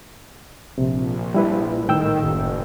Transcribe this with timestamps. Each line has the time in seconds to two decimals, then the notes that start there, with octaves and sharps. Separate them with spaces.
0.78 A#1 C3
1.34 G3 E4 B4
1.88 A2 D#3 G5 E6
2.23 F#1